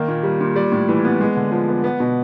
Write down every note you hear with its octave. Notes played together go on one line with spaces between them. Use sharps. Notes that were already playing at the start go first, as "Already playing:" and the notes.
Already playing: D#3 A#3
A#2
G3
A#2
G3 D5
A2
E3
B3
G#3
D3
F3
B3
B3
B2